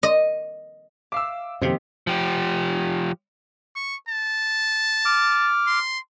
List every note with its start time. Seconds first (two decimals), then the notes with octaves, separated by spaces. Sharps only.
0.03 D#5
1.12 E5 F5 D6 E6
1.61 F#2 C3 D#3 F3 A#3 C4 G4
2.07 F3 G4
3.76 C#6
4.09 A5
5.05 D6 F6
5.67 C6